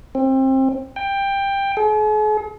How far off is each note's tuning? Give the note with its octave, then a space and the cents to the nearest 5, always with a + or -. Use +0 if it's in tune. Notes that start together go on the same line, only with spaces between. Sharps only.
C4 +25
G5 +15
G#4 +45